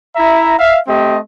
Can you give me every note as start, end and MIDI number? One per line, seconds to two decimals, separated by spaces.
0.16 0.55 64
0.16 0.55 76
0.16 0.55 82
0.58 0.78 76
0.58 0.78 77
0.87 1.17 57
0.87 1.17 60
0.87 1.17 67
0.87 1.17 75